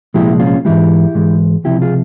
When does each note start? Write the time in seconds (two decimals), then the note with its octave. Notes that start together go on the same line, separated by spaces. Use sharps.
0.14 C2 A#2 F3 G#3 E4 G4
0.40 C#4 F4
0.65 G#2 E3 G#3 E4 G4
1.15 G#2 E3 G#3
1.64 C#2 C3 F3 E4 G4
1.82 F4 G#4